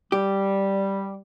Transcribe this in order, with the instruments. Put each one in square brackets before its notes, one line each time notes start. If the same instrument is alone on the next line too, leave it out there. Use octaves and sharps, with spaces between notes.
[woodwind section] G3 [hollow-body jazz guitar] G4